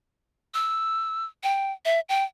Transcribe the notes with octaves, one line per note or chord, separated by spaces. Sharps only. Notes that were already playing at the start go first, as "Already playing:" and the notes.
E6
G5
E5
G5